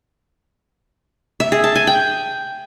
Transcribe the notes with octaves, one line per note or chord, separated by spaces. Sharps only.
E5
G#4
A5
G#5
G5